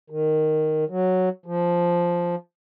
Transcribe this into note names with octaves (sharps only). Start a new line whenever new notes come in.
D#3
F#3
F3